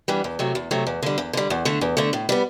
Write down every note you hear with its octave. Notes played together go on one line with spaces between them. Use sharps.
E3 G3 B3 D4
E2
C3 F#3 A3
E2
C3 F#3 A3
E2
D3 G3
E2
D3 G3
E2
D3 A3
E2
D3 A3
A2
G3 B3